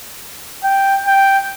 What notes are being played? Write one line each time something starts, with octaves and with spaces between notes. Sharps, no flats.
G5
G5